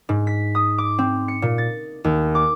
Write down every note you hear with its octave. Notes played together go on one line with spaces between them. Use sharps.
G#2
B6
D#6
D6
C4
C#7
A#2
A6
D#2
D6